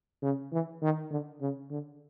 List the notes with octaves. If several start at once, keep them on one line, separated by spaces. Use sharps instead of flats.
C#3
E3
D#3
D3
C#3
D3